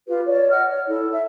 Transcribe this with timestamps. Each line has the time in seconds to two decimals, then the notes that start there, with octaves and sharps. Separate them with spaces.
0.07 F4 G4 B4
0.26 C#5 D5
0.51 D#5 F#5 F6
0.66 C#5
0.88 E4 A4
1.10 A4 E5